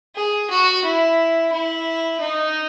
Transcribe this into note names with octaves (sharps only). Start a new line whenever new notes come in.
G#4
F#4
E4
E4
D#4